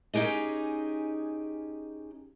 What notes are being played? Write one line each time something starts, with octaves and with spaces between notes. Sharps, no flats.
C#4 D#4 G4 G#4 D#5